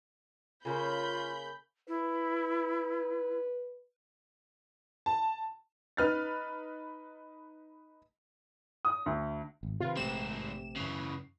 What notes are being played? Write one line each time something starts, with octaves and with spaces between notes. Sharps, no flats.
C#3 A#3 F4 C#5 B5 G6
E4 B4
A5
D#4 B4 F6 A6
D#6
D2
G#1
C3 D#3 F4 B4
A#1 G#2 A3 C4 G4 E7
F#2 C#3 E3 C7